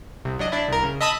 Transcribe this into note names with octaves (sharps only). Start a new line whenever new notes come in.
C2
F#3 D4 D#5
D4 E4
C2 A#4
C#3
D#5 E5 A5 B5 D#6